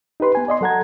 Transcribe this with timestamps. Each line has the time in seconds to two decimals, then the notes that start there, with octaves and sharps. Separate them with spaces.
0.20 D#4 G4 B4 C6
0.35 B3 G#5
0.48 D5 D#5 C6
0.61 F#3 A4 F#5 A#5 G#6